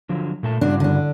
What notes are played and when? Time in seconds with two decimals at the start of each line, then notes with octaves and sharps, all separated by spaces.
0.09 D3 F3 F#3
0.43 A#2 A3 A5
0.61 G2 C#3 D4 F#4
0.80 D3 D4